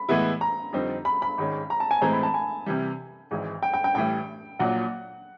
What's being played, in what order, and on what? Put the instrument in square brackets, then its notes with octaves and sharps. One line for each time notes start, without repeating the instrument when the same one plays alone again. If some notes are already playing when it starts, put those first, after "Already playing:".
Already playing: [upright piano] B5
[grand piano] A2 E3 G#3 B3 E4
[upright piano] A#5
[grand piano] F2 D3 G3 C4 D#4
[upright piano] B5
B5
[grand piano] G#1 G#2 D#3 G#3 C#4
[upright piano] A#5
A5
G#5
[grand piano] A2 E3 G#3 C4 [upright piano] A#5
[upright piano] B5
A5
G#5
[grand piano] C3 E3 G3
G#1 G#2 E3 G#3
[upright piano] G5
G5
G5
[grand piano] A1 A2 E3 G3 [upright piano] G5
[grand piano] A#1 A#2 F#3 [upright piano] F#5